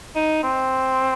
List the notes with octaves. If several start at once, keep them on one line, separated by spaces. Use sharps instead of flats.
D#4
C4